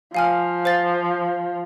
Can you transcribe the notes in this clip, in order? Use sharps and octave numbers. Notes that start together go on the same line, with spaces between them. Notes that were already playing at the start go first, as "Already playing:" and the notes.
F3 F5 G#5 F6
C5 F5 A6